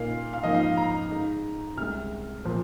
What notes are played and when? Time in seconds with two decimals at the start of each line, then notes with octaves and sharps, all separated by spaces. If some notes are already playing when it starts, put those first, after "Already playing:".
Already playing: A#2 A#3 D#4 F5
0.33 F5
0.43 G#2 F3 A#3 D#4 D#5
0.54 F5
0.77 A#5
1.10 G#2 G#3 D#4
1.77 C2 C3 G#3 F6
2.45 A#2 F3 A#3